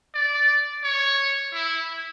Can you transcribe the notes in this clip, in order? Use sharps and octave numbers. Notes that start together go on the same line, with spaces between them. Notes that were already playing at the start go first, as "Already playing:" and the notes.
D5
C#5
E4